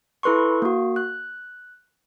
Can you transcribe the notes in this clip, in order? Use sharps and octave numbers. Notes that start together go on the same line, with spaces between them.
E4 A4 B4 C6 C#6
A#3 F#4
F#6